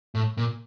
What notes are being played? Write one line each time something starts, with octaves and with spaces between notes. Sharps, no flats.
A2
A#2